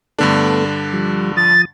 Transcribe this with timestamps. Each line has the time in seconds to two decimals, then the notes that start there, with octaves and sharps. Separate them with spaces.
0.19 G2 D3 A3 B3 D4 A4
0.93 F3 G3
1.37 F3 D#6 A6